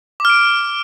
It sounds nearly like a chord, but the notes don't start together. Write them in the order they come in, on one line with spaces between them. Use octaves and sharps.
D6 F6 D7